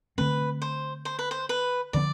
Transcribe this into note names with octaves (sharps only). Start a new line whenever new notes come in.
D3 A3 C4 B4
C5
C5
B4
C5
B4
D3 F3 B3 D5